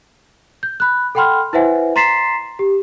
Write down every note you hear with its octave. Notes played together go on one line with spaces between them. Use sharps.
G6
B5 F#6
A4 F#5 G5 B5 C6 F6
E4 B4 C5 E5 F#5 G#5
A#5 C6 A6 B6 C7 E7
G4